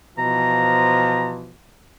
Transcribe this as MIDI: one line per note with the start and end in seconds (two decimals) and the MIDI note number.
0.18 1.55 47
0.18 1.55 52
0.18 1.55 53
0.18 1.33 82